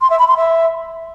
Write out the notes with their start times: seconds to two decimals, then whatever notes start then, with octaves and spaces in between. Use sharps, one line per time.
0.01 C6
0.10 E5
0.19 B5
0.28 C6
0.37 E5